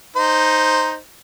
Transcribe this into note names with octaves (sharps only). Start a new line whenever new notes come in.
D#4 C5